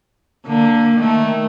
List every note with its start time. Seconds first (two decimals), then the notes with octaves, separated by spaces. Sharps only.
0.47 D3 A#3
0.97 D#3 A3